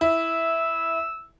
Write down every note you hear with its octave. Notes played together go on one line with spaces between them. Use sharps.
E4 E6